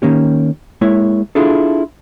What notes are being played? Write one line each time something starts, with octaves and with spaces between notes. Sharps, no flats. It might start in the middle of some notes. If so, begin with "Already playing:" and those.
D#3 A#3 C#4 G4
G#3 A#3 E4 C#5
D4 E4 F4 G#4 A4